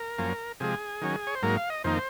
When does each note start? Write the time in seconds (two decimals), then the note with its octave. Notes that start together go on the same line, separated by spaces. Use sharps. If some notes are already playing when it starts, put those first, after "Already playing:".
Already playing: A#4
0.18 F#2 F3 A#3 C#4
0.60 C3 F3 G#3 G#4
1.02 D#3 F#3 C#4
1.27 C#5
1.35 C5
1.43 G#2 F#3 A#3 A#4
1.57 F5
1.70 D#5
1.84 F2 D#3 A#3 D#4 C5